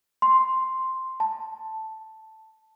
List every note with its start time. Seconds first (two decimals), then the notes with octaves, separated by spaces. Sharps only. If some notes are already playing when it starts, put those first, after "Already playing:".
0.22 C6
1.20 A5